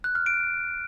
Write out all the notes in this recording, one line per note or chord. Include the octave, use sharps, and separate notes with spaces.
F#6
F6
D7